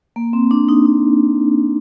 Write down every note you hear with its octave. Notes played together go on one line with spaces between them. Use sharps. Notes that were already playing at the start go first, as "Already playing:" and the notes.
A#3
C4
D4
D#4
D#4